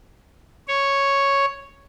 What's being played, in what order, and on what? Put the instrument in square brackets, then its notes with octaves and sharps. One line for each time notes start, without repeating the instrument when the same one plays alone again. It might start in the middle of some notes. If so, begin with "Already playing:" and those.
[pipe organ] C#5